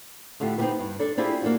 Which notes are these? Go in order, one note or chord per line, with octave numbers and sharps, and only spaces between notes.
A2 D3 A3 F4 G4
B3 C4 D#4 F#4 G4 B4
G2
D4 A4 D5
C4 D4 E4 F4 G4 G#4
A#3 D4 F#4